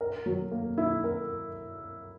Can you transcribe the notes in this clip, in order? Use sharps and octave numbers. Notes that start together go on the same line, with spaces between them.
A#4
F#3
A#3
E4
A#4